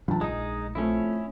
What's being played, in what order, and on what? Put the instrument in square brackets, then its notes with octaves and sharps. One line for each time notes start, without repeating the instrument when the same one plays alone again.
[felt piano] C#2 A5 [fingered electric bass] E3 F#3 D4
[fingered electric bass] A#1 [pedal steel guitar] G#3 D#4 [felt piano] D#6
[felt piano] F3 A3 C4 [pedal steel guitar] C#4 E4